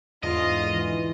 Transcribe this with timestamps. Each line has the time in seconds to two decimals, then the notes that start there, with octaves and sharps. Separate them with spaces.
0.23 E2 G#2 D3 F4 D#5
0.73 E3